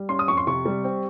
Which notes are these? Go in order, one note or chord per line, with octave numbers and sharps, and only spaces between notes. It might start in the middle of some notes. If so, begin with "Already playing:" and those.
Already playing: G3
C#4 C6
D#6
F2 C#6
C6
C3 C#6
G3
C4